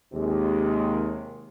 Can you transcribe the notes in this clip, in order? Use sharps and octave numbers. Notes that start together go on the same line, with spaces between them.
D#2 C3 G#3